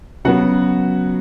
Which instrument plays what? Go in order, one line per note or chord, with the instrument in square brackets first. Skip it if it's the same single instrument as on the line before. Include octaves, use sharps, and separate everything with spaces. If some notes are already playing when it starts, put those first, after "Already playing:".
[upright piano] C#3 F#3 B3 F#4 F#5